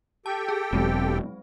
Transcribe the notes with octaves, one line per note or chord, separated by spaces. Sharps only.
G4 A4 G5 A5
G#4
E1 F#3 G#3 C4